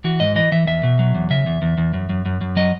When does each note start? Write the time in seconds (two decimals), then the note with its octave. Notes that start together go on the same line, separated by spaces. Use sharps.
0.04 E3 F#4
0.20 G#2 D#5
0.36 E3 D#5
0.52 E3 E5
0.67 E2 E5
0.83 B2
0.99 F#3
1.15 E2
1.30 C#3 E5
1.46 E2
1.62 E2
1.78 E2
1.94 F#2
2.09 F#2
2.25 F#2
2.41 F#2
2.56 F#3 D#5